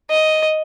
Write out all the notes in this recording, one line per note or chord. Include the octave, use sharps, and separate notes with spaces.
D#5